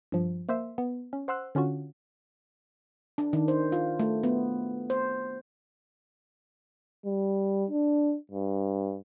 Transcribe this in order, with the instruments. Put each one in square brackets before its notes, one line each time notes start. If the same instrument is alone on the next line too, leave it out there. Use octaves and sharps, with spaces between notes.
[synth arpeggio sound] G2 F3
A#3 C5 E5
B3
C#4
C5 F#5 C6 E6 F#6
D3 C#4 F4 F#4
[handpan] D4
D#3
C5
F4
A3
B3
C5
[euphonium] G3
D4
G2